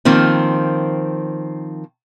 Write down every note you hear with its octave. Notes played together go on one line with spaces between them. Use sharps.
D#3 F3 A#3 C4